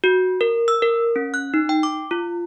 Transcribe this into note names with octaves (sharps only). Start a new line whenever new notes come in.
F#4
A#4
E6
A#4
C#4
F#6
D#4
G5
D6
F4